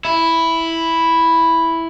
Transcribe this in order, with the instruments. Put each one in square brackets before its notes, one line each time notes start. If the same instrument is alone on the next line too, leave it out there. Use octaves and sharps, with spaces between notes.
[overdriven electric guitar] E4